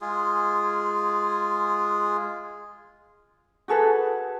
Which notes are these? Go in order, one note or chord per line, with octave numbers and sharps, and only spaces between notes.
G#3 F4 G#4
F#4 G#4 A4 B4